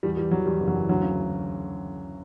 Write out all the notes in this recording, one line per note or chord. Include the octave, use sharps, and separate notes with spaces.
E2 G3
E3 G3
E3 F#3
E2 G3
F#1
F#3
E3
D2 F#3
C#3